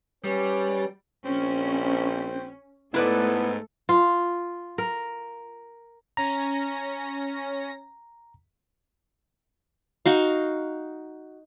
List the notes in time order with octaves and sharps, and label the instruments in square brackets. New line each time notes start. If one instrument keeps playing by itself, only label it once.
[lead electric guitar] G3 [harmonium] C#4 B4 C#5
[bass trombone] A#1 [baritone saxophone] C4 [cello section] C#4
[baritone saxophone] G#2 [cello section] A3 A4 [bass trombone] B3 [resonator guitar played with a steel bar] E4 B4 D5
[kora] F4
A#4
[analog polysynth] C#4 A#6 [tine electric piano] A#5
[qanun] D#4 F#4 F5